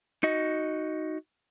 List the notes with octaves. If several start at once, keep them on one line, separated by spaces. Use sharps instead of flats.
D#4 F#4 D#5